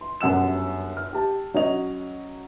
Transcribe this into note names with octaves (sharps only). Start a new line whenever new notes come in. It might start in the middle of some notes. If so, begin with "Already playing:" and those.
C6
G1 F#2 F#5 E6 E7
F6
G4 A5
F#3 C#4 C#5 D#5 F7